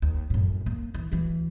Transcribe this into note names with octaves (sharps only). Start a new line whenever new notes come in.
D#2
F#2 A2
A#3
E3
D2 E3